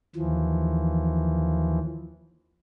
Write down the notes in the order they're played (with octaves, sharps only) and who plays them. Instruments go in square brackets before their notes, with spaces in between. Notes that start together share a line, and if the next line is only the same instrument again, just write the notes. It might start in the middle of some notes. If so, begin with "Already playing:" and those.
[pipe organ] D#2 E3 F3